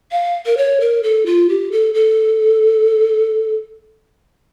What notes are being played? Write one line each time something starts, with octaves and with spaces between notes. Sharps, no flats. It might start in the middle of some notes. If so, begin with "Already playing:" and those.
F5
A#4
C#5
A#4
A4
F4
G4
A4
A4